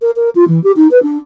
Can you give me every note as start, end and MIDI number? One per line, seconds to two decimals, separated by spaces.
0.01 0.11 70
0.16 0.29 70
0.35 0.44 65
0.48 0.61 52
0.63 0.72 67
0.76 0.87 63
0.91 1.01 71
1.02 1.18 62